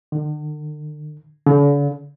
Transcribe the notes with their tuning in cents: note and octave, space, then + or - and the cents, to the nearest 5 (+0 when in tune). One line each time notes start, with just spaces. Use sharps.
D3 +45
D3 -45